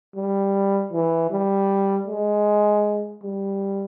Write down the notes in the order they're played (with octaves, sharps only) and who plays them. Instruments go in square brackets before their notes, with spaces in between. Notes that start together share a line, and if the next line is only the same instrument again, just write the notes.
[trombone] G3
E3
G3
G#3
G3